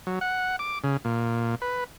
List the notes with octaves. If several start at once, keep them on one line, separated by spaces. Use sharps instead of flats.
F#3
F#5
D6
C#3
A#2
B4